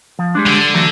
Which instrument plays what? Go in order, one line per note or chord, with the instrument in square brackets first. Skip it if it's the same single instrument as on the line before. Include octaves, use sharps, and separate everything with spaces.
[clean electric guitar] F3
G3 G#3 D4
[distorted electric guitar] D3
[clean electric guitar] E3 F#3 A3